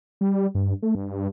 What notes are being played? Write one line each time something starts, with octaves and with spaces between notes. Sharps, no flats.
G3
G2
A3
G2